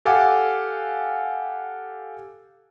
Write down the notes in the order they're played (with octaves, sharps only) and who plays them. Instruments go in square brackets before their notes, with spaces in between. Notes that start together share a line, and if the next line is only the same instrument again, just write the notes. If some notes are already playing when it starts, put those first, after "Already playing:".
[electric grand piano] G4 A4 F5 F#5 G#5 D6